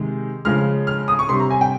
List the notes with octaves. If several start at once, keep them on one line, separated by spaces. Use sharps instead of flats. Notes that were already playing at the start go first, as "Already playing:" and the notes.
Already playing: C3 D#3 G#3
C#3 F3 G#3 F6
F6
D#6
C#6
C3 G3 C6
A#5
G#5
G5